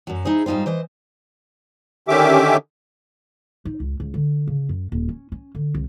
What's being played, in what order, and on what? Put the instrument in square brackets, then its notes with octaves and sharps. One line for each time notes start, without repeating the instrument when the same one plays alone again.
[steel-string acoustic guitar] F#2 F#3
D#4 E4 G#4 C5
G#2 G3 D#4 F4 C5
E3 C5 D#5
[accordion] D3 D#3 C#4 G4 E5 D6
[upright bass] D#4
C#2
C#2
D3
C#3
F#2
D#1
C#4
C#4
D3
C2